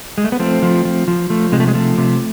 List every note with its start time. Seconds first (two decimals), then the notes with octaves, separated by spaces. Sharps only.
0.18 G#3
0.24 A3
0.32 B3
0.39 F3 A3 C4
0.62 F3
0.85 F3
1.08 F3
1.30 F3 A3
1.52 C3 G#3
1.60 A3
1.68 G#3
1.74 F3 A3
1.98 C3